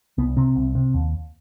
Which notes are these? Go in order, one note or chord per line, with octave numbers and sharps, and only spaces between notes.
C2 B3
C3 C4
C2
C3
D#2